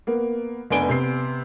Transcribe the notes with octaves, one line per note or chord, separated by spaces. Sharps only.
A#3 B3
F1 B3 D4 G#5 D7 G7
C3 B3 C7